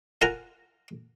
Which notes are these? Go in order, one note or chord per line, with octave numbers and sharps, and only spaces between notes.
F4 A#4 F#5 G#5 A#5